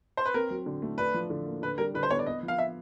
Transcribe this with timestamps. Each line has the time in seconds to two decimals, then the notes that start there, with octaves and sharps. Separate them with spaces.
0.17 C5
0.26 B4
0.34 C4 A#4
0.50 F#3
0.66 D3
0.82 A3
0.98 D4 B4
1.14 F3
1.30 D3
1.46 A#3
1.62 D3 B4
1.78 G3 A#4
1.94 D3 B4
2.03 C5
2.10 B3 C#5
2.19 D5
2.26 B3 D#5
2.43 F3
2.48 F5
2.58 E5